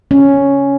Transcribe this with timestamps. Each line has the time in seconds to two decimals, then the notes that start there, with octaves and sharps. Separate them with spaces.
0.11 C#4